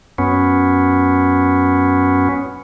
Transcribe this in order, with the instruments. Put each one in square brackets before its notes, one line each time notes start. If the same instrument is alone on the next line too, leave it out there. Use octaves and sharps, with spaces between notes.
[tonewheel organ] F#2 B3 C#4